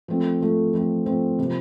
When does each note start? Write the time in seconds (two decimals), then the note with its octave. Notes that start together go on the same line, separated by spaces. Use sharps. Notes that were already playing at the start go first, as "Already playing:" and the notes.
0.08 F3 A3 C4
0.41 F3 A3 C4
0.73 F3 A3 C4
1.06 F3 A3 C4
1.39 C3 F3 A#3